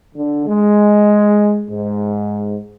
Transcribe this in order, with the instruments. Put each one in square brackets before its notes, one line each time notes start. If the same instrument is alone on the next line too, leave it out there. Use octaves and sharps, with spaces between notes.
[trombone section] D3
G#3
G#2